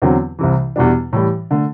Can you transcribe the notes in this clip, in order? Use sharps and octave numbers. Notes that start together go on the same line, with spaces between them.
E2 D3 F#3 C4
C2 C3 E3
E2 B2 G3 D4
A2 E3 G3
D3 A3